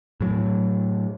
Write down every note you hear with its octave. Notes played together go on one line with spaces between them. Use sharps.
A2 F#3